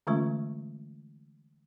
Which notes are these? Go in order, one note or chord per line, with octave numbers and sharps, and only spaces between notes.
D3 E3 G#3 A3 C#4 F4